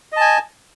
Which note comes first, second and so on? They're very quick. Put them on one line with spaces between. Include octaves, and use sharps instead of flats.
D#5 A5 G#5